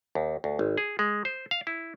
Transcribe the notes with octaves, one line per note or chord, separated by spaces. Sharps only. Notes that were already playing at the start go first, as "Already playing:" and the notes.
D#2
D2
G#1
G#4
G#3
C5
F5
E4